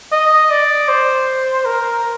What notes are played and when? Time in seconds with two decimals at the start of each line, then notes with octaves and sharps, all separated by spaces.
0.12 D#5
0.51 D5
0.88 C5
1.65 A#4